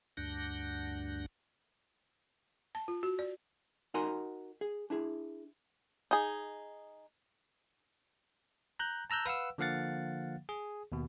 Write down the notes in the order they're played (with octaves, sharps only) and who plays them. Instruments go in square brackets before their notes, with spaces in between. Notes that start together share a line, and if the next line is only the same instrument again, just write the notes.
[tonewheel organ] D2 G2 D4 F#5 G6 A#6
[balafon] A5
F4
F#4
D5
[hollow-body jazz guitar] D#4 F#4 A#4 G#5 A#5 C6
G#4
D4 E4 G#4
[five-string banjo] D#4 G#4
[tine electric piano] A#5 F#6 G6
A5 A#5 E6 F#6 G6
B4 F5 F#5 E6
D3 F3 A#3 F5 F#5 A6
G#4
D#2 B2